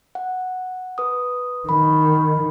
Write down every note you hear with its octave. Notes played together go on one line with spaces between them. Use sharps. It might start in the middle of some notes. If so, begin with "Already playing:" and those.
F#5
B4 D#6
D#3 B5